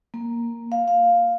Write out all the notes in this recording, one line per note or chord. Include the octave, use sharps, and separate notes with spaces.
A#3
F5
F5